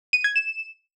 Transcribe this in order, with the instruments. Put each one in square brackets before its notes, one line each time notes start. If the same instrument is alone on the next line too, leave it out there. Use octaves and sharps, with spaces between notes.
[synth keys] D#7
G#6
E7